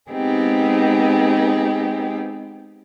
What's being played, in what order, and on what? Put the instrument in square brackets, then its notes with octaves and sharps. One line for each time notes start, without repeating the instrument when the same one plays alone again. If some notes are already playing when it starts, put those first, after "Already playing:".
[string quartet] G#3 B3 C4 D#4 G4 G#4